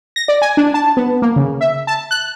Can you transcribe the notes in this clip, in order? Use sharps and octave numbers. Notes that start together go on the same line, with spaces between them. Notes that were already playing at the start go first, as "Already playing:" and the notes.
A#6
D5
G#5
D4
A5
B3
A#3
C#3
E5
A5
F#6